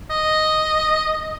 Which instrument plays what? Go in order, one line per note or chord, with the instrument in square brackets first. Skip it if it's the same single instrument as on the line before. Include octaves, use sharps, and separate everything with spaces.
[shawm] D#5